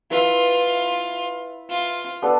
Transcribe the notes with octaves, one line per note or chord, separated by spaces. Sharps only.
E4 F4 B4 E5
F4
B3 D4 A4